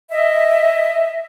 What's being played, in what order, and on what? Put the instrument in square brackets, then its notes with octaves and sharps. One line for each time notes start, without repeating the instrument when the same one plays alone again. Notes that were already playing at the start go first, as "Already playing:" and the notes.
[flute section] D#5 E5